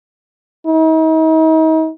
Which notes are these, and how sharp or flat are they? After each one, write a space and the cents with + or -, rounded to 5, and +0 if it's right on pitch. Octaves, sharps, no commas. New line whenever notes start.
D#4 +40